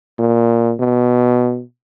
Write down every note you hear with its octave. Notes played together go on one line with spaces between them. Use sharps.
A#2
B2